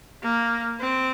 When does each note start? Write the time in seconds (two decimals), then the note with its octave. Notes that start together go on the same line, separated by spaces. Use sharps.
0.23 A#3
0.80 C4